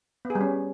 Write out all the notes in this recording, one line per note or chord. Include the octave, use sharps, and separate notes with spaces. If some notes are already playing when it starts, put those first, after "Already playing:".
B3
G#4
G3
C#4